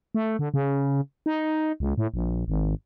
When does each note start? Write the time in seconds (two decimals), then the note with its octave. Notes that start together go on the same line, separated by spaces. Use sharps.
0.15 A3
0.39 D3
0.54 C#3
1.26 D#4
1.80 C#2
1.98 A2
2.14 A#1
2.48 G#1